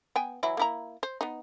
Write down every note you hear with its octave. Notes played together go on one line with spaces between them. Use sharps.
B3 G5 G#5
E3 F#3 E4
A#3 E4 A#5
C5
B3 D#4